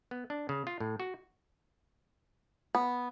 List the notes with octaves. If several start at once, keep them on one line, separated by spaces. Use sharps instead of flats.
B3
D4
C#3
F4
A2
F#4
B3